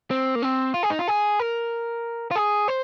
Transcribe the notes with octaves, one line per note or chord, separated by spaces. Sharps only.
C4
A#3
C4
F4
G#4
D#4
F4
G#4
A#4
F4
G#4
C5